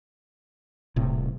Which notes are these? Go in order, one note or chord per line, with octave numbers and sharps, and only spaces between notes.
D#1 A2 C3